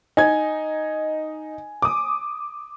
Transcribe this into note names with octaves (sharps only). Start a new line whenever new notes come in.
D#4 G#5 G#6
D6 D#6